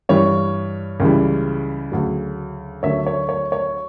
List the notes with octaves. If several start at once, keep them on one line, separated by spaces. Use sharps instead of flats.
G2 E3 G3 C#5
C#2 C#3 E3 G3
D2 C#3 F#3
D2 D3 F#3 C#5 E5
C#5
C#5
C#5